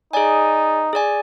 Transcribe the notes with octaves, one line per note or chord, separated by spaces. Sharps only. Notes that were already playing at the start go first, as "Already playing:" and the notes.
D#4 G#4 D5 G#5
G#4 D5 G#5